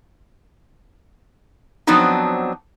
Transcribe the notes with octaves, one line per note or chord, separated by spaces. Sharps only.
F3 F#3 B3 C4 D4 D#4